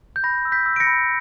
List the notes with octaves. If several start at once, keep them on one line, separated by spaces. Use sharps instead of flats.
G6
B5 A#6
E6
G6 B6
E6
D7
A#6 C#7
B5